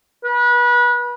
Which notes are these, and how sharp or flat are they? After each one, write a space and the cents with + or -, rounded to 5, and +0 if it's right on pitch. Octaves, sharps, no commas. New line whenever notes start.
B4 -30